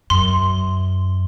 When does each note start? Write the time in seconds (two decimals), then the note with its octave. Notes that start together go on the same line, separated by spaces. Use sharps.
0.10 F#2 C6